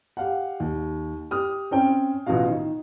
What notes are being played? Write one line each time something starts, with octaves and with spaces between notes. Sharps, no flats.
G4 F5 F#5
D#2
G4 D#6 F6
C4 C#4 G5
A1 B2 F4 F#4 F5
D#3